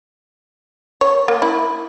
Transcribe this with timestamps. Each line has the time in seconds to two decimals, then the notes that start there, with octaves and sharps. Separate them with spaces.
1.01 C#5
1.28 A#3
1.42 E4